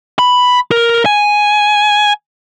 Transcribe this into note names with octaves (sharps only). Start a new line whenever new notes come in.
B5
A#4
G#5